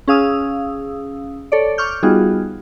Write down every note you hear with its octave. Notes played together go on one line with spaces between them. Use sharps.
C#4 G#4 F5 D#6 E6
A4 C#5 D5
C#6 D6 F6 G6
G3 B3 D#4 F4 F#4 G#4